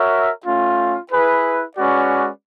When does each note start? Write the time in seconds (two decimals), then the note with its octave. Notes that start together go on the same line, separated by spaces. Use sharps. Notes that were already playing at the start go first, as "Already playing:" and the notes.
Already playing: F#4 A#4 C#5 E5
0.44 A3 C#4 F4
1.11 E4 G#4 B4
1.77 G#3 C#4 F#4 B4 D5